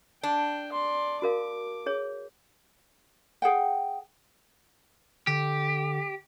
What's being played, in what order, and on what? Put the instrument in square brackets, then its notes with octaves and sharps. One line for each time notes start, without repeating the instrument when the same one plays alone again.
[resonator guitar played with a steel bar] D4 [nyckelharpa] G5
[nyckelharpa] D5 C6
[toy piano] F#4 A#4 F5 [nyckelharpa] D6
[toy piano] G#4 C#5
[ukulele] G#4 F#5 G5
[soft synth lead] D3 [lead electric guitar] G4